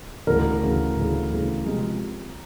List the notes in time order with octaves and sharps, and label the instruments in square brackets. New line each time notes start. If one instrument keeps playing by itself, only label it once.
[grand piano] D2 C#3 E3 [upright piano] A#4
[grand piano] D2 C#3 E3
D2 C#3 E3
D2 C#3 E3
C3 F3 G#3